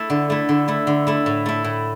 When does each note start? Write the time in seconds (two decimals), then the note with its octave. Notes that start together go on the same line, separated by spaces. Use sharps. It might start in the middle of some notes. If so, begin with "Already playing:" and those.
Already playing: A3 E4
0.10 D3
0.30 A3 E4
0.49 D3
0.68 A3 E4
0.87 D3
1.07 A3 E4
1.26 A2
1.46 A3 E4
1.64 A2